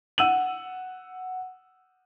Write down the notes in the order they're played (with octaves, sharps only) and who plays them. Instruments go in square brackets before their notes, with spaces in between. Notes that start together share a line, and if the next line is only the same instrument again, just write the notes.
[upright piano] F#5 E6 D#7 F#7